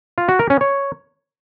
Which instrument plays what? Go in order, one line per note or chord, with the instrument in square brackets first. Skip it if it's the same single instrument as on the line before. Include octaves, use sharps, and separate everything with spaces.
[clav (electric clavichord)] F4
F#4
A#4
C#4
C#5